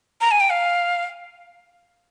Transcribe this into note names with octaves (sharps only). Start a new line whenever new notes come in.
A#5
G#5
G5
F5